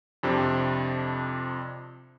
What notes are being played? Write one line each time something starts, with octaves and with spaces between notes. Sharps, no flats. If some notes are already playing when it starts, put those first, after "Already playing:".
F2 C3 D4